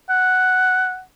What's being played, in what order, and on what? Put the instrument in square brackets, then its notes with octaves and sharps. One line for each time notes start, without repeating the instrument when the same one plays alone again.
[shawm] F#5